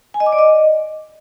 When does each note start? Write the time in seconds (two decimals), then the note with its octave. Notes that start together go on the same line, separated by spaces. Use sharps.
0.14 G#5
0.20 D#5
0.26 D6
0.32 D5
0.39 D#5